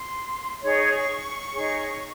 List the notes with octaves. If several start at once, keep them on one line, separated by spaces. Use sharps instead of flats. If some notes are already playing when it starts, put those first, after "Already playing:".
Already playing: C6
D#4 G#4 C#5 C#6
D#4 G#4 C#5